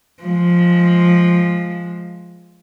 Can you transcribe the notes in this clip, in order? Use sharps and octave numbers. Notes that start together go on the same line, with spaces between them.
F3 G#3